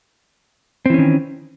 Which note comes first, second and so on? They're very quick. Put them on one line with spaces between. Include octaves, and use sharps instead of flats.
C4 E3 C#4 D#3